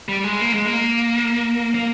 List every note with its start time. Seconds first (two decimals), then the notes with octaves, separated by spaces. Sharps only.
0.08 G3
0.24 G#3
0.41 A#3
0.54 G#3
0.66 A#3
1.74 A#3